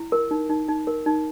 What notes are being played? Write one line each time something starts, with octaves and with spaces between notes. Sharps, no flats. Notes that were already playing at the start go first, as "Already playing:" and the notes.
Already playing: E4
A#4
D#4
D#4
D#4
A#4
D#4